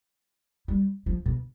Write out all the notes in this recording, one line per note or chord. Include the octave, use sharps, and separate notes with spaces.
G3
F3
B2